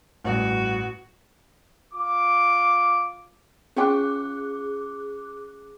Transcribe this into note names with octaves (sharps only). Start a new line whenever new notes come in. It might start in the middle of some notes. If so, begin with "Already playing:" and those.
A1 G2 F#4
F4 D6
C#4 F4 G#4 G5 D6 F#6